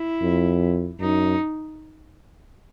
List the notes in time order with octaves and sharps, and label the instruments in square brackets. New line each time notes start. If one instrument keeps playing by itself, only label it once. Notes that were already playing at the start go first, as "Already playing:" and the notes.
Already playing: [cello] E4
[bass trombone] F2
[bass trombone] F#2 [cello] D#4